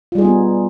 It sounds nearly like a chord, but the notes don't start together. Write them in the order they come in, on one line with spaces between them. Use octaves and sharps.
F4 G3 G#4 D#4 B3